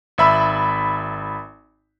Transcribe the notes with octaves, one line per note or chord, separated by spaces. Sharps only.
G#1 E5 B5 E6